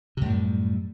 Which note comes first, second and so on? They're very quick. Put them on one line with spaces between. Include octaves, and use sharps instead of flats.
C3 F#2 A2 G3